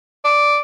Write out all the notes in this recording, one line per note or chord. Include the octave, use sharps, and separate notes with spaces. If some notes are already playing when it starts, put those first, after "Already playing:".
D5